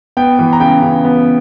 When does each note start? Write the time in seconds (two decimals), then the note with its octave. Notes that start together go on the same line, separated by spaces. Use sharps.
0.17 B3 G5
0.39 E3
0.53 A#5
0.60 C#3 G5
0.82 C#3
1.05 B3